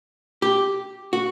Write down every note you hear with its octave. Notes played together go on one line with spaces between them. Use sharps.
G4
F#4